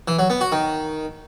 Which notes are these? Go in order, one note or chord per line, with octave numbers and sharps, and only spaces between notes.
E3
F#3
B3
F#4
D#3